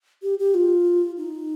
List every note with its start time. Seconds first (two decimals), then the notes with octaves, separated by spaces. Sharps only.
0.23 G4
0.39 G4
0.54 F4
1.17 D#4